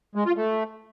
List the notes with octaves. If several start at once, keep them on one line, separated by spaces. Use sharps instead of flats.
G#3
F4
A3